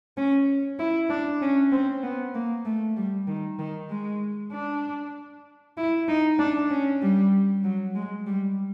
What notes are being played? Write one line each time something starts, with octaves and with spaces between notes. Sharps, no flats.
C#4
E4
D4
C#4
C4
B3
A#3
A3
G3
D#3
D#3
G#3
D4
E4
D#4
D4
C#4
G3
F#3
G#3
G3